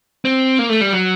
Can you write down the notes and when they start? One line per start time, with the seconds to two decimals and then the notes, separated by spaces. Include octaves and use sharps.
0.25 C4
0.59 A#3
0.69 A3
0.81 G3
0.93 F#3